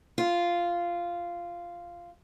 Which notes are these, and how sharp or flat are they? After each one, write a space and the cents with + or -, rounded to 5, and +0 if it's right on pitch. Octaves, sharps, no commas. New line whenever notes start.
F4 -10